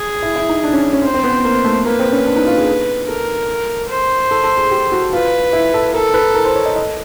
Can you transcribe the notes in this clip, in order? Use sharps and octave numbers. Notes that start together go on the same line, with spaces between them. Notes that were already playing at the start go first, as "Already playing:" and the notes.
Already playing: G#4
E4
E4
D#4
D4
C#4
C#4
C4 C5
C4
B3
A#3
A3
A#3 B4
C4
C#4
D4
D#4
F4
G#4
A4
A4 A#4
C5
A4
A4
G#4
G4
F#4
F4 B4
E4
A4
A4 A#4
B4
A#4
C5
C#5
D#5
D#5